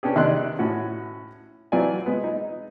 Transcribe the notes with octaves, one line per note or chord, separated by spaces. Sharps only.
B3 C#4 D4 G4 G#4
C3 D#3 D5 D#5 C6 F#6
A2 C#4 F#4
E3 F#3 C4 F4 D5 G#5
G#3 B3
D#4